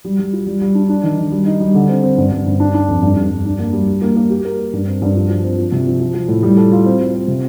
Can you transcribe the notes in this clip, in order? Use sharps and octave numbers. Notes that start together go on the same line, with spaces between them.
G3
G3
F4
G3
G3
D4
D4
D#3
D#3
G3
D#4
G3
D3
C4
C4
G2
G2
G2
D4
D4
F2
G2
G2
G2
D4
A#3
G3
G3
A#3
A#3
G4
A#4
A#4
G2
C4
G2
F3
F3
C4
F3
C3
F3
F3
F3
A2
G3
A4
F4
C4
F4
C4
C3